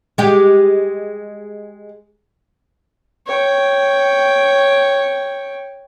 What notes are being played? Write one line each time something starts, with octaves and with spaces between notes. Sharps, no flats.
G#3 G4
C#5 G5